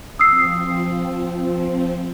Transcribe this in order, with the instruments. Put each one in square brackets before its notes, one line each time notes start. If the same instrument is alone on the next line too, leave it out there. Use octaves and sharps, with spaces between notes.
[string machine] F3 C4 [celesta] D#6 E6 C7